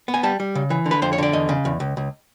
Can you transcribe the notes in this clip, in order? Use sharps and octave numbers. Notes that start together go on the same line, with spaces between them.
B3
G#5
G3 A5
G3
C#3
E3
D3
B4
F2 C5
C#5
D3 D5
E2 D#5
C#3
E2
C#2
C#2